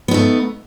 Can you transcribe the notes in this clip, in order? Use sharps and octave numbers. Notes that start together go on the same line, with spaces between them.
A3 B3 D#4